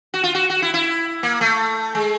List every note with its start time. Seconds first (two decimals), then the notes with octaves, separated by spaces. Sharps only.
0.14 F#4
0.23 F4
0.35 F#4
0.50 F#4
0.62 E4
0.74 E4
1.23 A#3
1.41 A3
1.95 G#3